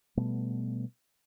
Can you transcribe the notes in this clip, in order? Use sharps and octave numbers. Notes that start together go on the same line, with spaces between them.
B2 G3 A3 B3